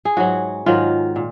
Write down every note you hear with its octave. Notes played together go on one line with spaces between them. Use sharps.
G#4
G#2 F#3 F#4
G#2 D#3 F#3 F4
A#2